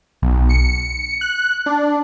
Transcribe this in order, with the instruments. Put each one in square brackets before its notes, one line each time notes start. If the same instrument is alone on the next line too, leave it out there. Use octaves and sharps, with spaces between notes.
[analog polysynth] B1
C#7
F#6
D4